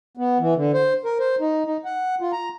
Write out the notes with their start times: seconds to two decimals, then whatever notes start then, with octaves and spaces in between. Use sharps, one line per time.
0.17 B3
0.39 E3
0.56 D3
0.74 C5
1.05 A#4
1.20 C5
1.40 D#4
1.65 D#4
1.85 F#5
2.21 F4
2.33 A#5